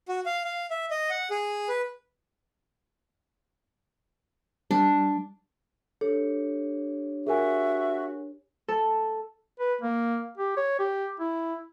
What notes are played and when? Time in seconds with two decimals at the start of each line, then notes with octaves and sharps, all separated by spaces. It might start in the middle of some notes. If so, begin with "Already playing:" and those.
0.08 F#4
0.26 F5
0.44 F5
0.71 E5
0.91 D#5
1.10 F#5
1.31 G#4
1.69 B4
4.71 G3 D4
6.01 D4 G4 A4 C#5
7.27 F#4 G#4 A#4 E5 G#5
8.68 A4
9.60 B4
9.81 A#3
10.38 G4
10.57 C#5
10.79 G4
11.20 E4